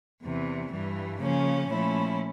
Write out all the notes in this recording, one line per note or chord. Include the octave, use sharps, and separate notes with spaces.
E2 C3 E3
G2 E3 G3
C#3 F3 A#3 C#4
A#2 F3 A3 C#4 E4